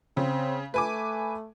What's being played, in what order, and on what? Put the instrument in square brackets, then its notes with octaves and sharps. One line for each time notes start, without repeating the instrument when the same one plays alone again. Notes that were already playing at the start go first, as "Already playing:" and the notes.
[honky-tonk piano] C#3 [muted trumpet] C4
[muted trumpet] A3 [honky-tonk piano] B4 G#5 D6